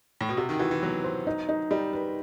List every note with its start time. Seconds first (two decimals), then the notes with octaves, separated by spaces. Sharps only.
0.21 A2
0.29 B2
0.37 C3 F#4
0.49 D#3
0.59 E3 F#4
0.71 E3
0.82 F#3 B3
1.04 C5
1.27 D#4
1.49 D#4
1.71 G3 D#4
1.93 B4